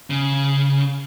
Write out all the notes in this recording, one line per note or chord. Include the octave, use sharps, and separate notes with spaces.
C#3